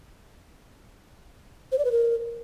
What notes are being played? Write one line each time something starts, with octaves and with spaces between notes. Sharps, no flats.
C5
D5
B4
A#4